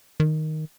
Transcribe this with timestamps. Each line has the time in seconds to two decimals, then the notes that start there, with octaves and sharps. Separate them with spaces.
0.20 D#3